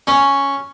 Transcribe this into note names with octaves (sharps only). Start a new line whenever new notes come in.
C#4